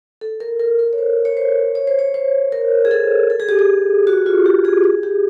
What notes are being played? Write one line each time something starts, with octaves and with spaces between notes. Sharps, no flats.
A4
A#4
A#4
A#4
C#5
C5
C#5
C5
C#5
C5
C#5
C5
A#4
G#4
A4
A4
G#4
G4
G#4
F#4
F4
G4
G#4
G#4
G4